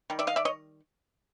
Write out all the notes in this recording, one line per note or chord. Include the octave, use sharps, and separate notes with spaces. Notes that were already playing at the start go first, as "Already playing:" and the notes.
D#3 G3
D5 E5
D#5 F5
D5 E5
C#5 D#5